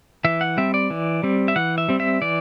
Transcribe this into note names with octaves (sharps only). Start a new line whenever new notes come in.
E3 E5
F#5
G3 C4 E5
D5
E3
G3 C4
E5
E3 F#5
E5
G3 C4
E5
E3 D5